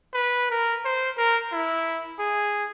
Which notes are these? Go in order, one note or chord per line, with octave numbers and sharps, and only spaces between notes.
B4
A#4
C5
A#4
E4
G#4